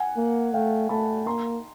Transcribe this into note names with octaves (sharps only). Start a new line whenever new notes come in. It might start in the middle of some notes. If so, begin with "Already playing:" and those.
Already playing: F#5 G#5
A#3
A3 F5 G5
A3 A5 B5
A#3 A#5 C6